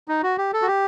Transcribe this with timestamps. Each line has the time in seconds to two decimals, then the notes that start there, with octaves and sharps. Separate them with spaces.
0.08 D#4
0.23 F#4
0.38 G4
0.53 A4
0.62 F#4
0.68 G4